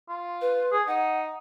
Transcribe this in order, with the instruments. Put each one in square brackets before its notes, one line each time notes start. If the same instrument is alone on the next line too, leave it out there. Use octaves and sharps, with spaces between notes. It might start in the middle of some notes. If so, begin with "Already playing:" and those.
[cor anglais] F4
[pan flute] B4
[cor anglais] G#4
[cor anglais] D#4 [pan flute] F#5